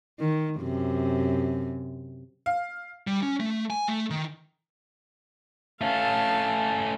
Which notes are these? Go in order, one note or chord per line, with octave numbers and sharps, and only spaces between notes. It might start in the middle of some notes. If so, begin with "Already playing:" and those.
D#3
F#2 C3
F5
G3
C#4
A3
G#5
A3
D#3
A3 C#4 F5 A5